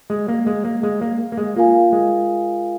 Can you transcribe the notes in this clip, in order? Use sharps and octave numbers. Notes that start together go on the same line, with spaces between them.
G#3
A#3
G#3
A#3
G#3
A#3
A#3
G#3
A#3 F4 A#4 F5 G#5
G#3